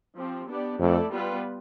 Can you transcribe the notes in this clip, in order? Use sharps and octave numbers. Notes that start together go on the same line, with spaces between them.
F3 C4 G4
B3 D4 G4 D5
F2 A3 E4 A4 D5
G3 B3 F4 B4